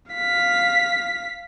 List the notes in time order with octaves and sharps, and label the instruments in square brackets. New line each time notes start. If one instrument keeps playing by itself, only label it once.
[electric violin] F5 B6